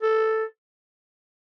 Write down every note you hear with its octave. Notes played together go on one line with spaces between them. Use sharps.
A4